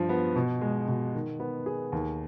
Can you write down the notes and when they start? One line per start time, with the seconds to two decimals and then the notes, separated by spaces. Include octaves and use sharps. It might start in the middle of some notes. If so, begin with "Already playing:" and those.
Already playing: G2 F3
0.09 B3
0.36 B2
0.61 G#3
0.88 B2
1.14 D#3
1.40 B3
1.66 G#4
1.92 D#2